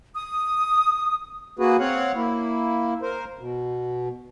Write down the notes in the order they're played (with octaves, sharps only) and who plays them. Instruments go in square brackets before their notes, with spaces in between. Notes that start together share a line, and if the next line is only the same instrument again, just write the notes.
[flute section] D#6
[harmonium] A#3 F#4 G#4 B4
C4 C#5 F5 F#5
A#3 E4
A#4 C5
B2